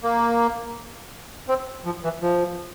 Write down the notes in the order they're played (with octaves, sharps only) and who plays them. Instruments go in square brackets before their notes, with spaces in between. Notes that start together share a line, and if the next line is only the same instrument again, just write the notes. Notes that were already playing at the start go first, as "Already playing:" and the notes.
[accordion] A#3
C4
F3
E3
F3